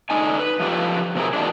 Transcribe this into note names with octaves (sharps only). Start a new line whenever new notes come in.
D3 D#4 G#5
B4
F3 A3 G4 B4
C3 F#3 C4 F#4 G#4 A#4
E2 B2 D#3 D4